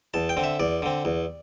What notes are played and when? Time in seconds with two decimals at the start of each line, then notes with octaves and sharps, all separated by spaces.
0.14 E2 A5
0.29 G5
0.37 D3 C4
0.44 E5
0.60 E2 D5
0.82 D3 C4
1.05 E2